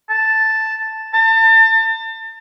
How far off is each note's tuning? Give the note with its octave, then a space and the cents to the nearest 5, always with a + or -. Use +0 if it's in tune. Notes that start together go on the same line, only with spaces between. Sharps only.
A5 +0
A5 +35